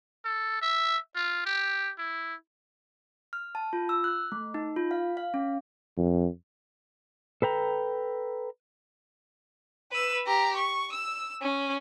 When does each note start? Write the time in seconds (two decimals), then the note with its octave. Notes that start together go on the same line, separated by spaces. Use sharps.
0.25 A4
0.62 E5
1.15 F4
1.46 G4
1.98 E4
3.33 F6
3.55 A5
3.73 F4
3.89 E6
4.04 F#6
4.32 A3
4.54 D#4
4.76 F4
4.91 F5
5.17 F5
5.34 C#4
5.97 F2
7.42 A4 B4 G5 A#5
9.91 B4 E6
10.26 G4 A#5
10.57 C#6
10.92 E6
11.41 C#4